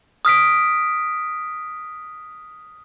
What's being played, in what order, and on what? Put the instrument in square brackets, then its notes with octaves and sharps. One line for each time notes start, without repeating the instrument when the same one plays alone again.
[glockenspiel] D#6 F6 B6 D7